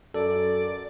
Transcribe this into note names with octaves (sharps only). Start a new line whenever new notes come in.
F#2 A4 D5